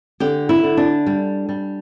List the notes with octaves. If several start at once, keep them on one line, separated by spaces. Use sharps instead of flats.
D3 G4
E4
D3
D4
G3
G3